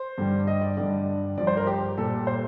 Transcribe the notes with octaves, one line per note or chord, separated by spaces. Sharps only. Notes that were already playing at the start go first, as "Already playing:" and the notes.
Already playing: C5
G2 D3 G3
D#5
D5
G2 D3 G3 D5
G2 F3 D5
C5
A#4
G4
A#2 G3 A4
C5